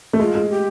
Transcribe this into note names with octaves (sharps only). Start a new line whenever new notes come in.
A3
G#3 F4
G#3
G4